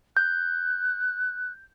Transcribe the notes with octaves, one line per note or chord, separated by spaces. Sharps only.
F#6 G6